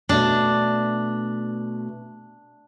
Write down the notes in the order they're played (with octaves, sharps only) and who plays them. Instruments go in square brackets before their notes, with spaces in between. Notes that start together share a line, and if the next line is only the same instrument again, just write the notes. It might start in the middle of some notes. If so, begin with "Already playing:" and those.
[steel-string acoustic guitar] B2 A3 [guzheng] D4